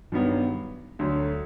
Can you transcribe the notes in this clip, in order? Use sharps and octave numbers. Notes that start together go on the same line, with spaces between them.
G2 D#3 F#3 B3
D2 D3 F#3